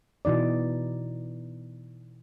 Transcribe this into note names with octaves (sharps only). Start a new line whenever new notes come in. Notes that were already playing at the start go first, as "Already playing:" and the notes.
B2 E3 D#4 D5